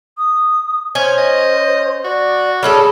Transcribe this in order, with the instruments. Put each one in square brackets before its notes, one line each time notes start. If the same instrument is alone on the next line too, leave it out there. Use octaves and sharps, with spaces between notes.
[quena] D#6
[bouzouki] C#4 [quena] C5 [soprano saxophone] G#5
[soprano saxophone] D#5
[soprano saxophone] F#4 [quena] D5
[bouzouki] G3 C#4 A4 [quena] G#4